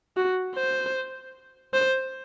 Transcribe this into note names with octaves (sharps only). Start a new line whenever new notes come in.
F#4
C5
C5